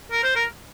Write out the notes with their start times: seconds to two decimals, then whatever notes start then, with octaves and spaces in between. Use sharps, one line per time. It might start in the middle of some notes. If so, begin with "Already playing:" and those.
0.11 A#4
0.23 C5
0.35 A#4